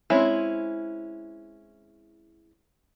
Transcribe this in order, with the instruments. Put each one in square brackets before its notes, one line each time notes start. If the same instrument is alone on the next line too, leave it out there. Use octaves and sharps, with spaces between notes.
[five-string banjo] G#3 C4 C#4 E4